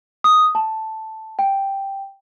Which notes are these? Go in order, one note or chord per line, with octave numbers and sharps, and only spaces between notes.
D#6
A5
G5